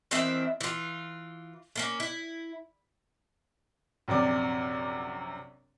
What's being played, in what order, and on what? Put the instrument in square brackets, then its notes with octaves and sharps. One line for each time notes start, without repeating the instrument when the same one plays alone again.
[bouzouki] D#3 E3 C4 E5
E3 F4
A3 A#3 C#4
E4
[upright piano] A#1 F#2 C3 D5